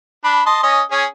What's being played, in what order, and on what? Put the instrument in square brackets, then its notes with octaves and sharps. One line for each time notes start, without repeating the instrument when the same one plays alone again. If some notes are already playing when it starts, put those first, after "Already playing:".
[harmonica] D4 B5
D#5 A5 C6
C#4 D#5
C#4 G#4